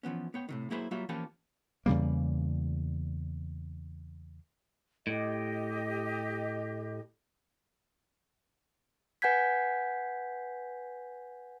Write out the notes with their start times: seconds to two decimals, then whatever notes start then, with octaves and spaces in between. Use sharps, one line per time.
0.03 E3 F3 B3 C#4
0.34 B3 C#5 G5
0.49 A2 C3 D#3
0.70 F#3 A#3 E4 G#4 B4 C5
0.91 F#3 G3 A#3 F4 E5
1.09 E3 F3 A#3 C#4 G4 A5
1.86 E2 C#3 G3 A#3
5.07 A2 G4 D#5
9.22 B4 F#5 G#5 G6 G#6 B6